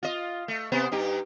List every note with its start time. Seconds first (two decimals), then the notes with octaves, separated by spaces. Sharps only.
0.03 F4 D#5
0.48 A3
0.72 C3 B3 C5
0.92 G2 D#4 G4